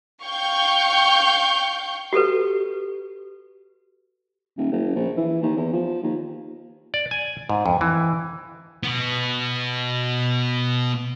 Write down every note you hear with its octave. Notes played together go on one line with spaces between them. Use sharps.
F5 G5 C#6 G6
F#4 G4 A4 B4
D#1
F#1
A#1
E3
D#2
E2
F3
D#2
D5
G#5
G#2
F2
E3
B2 B3